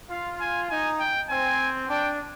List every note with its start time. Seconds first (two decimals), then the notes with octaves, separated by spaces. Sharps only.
0.10 F4 F5
0.40 G#5
0.70 D#4 G#5
1.00 G5
1.29 C4 G#5
1.89 D4 G5